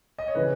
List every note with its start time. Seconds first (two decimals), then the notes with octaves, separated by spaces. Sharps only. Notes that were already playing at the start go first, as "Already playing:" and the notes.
0.18 D#5
0.28 C#5
0.35 C#3 E3 B4